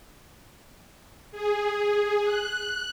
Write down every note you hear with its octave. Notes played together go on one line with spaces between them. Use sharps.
G#4
F#6